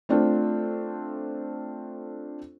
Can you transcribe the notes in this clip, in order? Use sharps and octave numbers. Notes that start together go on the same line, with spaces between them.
A3 C4 D4 F4 A4 C5